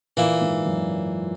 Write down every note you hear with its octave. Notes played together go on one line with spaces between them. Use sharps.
A#2 E3 A#3 E4
G#2
F#2